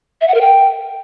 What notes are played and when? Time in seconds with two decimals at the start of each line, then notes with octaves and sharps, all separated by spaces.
0.21 E5
0.28 F#5
0.34 A#4
0.41 G5